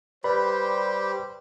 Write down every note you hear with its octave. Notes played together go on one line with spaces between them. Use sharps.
G3 G4 B4 C5 D5 B5